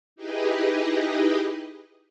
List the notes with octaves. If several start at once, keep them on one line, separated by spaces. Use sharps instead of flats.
D#4 E4 G4 G#4 B4 D#5